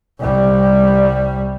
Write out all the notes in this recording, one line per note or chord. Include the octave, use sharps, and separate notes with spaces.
C2 G3